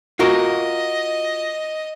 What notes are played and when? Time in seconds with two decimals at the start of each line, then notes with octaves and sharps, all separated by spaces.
0.19 F4 F#4 A#4 D#5